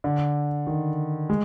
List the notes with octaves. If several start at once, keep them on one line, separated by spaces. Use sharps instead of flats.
D3
D#3
G#3